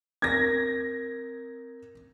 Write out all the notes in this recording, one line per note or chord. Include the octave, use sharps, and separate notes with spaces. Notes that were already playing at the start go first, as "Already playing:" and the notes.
C4 A#4 G#6 A#6